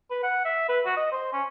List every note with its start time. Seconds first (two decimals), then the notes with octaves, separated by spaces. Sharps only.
0.10 B4
0.23 F#5
0.45 E5
0.69 B4
0.85 F#4
0.97 D#5
1.12 C5
1.33 C#4